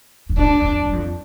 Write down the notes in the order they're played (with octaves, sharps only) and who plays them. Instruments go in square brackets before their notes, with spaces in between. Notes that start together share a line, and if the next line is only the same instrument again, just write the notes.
[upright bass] G2
[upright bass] A2 [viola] D4
[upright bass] F2
G2
F2